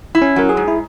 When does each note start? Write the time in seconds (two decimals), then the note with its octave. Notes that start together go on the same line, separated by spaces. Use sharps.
0.15 E4
0.22 C#4
0.36 F#3 A#4
0.49 G#4
0.57 G#2
0.68 E4